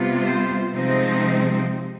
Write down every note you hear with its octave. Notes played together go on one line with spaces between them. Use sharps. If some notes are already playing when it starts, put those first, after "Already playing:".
Already playing: C3 G3 B3 F4
C5
C3 F3 G#3 C4 D#4